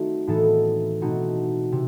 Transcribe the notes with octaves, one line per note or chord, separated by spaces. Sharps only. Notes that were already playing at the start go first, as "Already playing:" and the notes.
Already playing: D#3 A3 C4 D#4 F#4
A2 E3 B3 D#4 A4
B2 A3 C4 D#4 F#4
C3